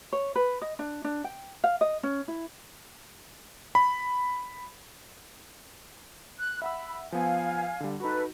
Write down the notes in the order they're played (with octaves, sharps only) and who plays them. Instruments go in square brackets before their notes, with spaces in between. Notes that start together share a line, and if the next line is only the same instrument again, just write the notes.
[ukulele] C#5
B4
D#5
D4
D4
G5
F5
D#5
C#4
E4
[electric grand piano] B5
[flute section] F#6
[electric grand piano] E5 F#5 E6 [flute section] B5
[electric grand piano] F3 B3 [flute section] F5 G#5
[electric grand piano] D3 G3
[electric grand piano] D#4 F#4 [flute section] A4 B4